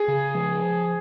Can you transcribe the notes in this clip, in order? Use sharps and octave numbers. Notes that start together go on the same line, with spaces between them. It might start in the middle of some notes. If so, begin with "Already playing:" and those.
Already playing: G#4
C#3
F3